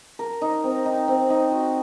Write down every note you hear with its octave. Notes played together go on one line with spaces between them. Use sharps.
A#4
D#4
C4
D#4
C4
D#4
F#4